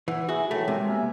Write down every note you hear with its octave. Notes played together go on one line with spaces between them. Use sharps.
E3 F#5
E4 F#4 G#4
D#3 E3 F#3 A3
C3 G#3 G4
A#3 B3 E5 G#5